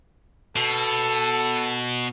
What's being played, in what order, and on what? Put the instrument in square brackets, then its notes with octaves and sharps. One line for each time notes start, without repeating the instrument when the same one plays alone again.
[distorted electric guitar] B2 [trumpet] A4